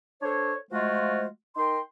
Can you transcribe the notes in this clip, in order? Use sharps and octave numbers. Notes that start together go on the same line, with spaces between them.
D4 A4 C5 C#5
F3 G#3 A3 F4 F#4 C5
D#4 A#4 G5 C6